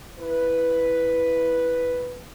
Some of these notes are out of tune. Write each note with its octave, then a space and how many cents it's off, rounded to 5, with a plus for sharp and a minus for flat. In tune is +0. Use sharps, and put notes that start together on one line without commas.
E4 +0 B4 +0